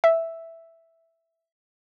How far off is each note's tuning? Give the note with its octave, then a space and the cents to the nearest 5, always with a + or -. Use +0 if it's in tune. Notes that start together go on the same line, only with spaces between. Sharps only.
E5 +0